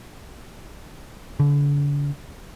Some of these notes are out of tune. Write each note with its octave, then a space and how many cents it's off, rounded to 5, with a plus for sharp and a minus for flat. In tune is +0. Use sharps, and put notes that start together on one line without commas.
D3 -40